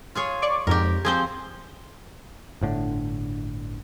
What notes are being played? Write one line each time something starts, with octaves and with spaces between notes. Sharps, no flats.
F4 G#4 C#5
D5 C#6 D6
F2 G#2 G4 A#4
F3 C4 G#4 C5 G6
G1 A2 D3